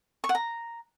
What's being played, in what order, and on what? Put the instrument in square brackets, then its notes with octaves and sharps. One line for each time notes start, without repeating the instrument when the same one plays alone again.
[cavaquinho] C#6
F#5
A#5